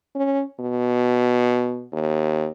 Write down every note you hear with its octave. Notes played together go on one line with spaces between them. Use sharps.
C#4
B2
D#2